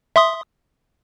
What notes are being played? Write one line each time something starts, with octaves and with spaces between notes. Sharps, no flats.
E5 C6 D#6